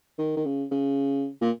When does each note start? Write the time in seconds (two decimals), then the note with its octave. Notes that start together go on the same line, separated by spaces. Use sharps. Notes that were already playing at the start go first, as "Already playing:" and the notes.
0.19 D#3
0.37 D#3
0.45 C#3
0.71 C#3
1.41 A#2